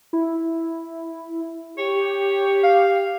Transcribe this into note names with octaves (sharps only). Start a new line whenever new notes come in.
E4
G4 C#5
F5